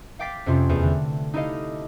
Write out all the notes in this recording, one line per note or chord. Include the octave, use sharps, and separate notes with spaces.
F5 G5 D6 A6 B6 C7
F2 C3 C#4 F4
E2 A3
D3
D#4 E4 G4 A4 D#5 F5